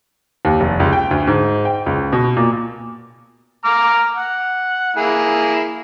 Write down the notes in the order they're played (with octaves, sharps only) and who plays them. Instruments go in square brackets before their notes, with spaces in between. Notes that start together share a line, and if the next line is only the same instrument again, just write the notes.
[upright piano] D#2
F1
C#2
G5
D2
G#2
G5
C#2
B2
A#2
[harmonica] A#5 D6 F6
F#5
A#3 E4 G#4